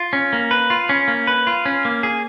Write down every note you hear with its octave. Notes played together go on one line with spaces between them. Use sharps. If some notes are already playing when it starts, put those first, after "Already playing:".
Already playing: F4
C#4
A#3
B4
F4
C#4
A#3
B4
F4
C#4
A#3
G#4